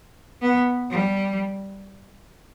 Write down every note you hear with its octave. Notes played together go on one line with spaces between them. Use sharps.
B3
G3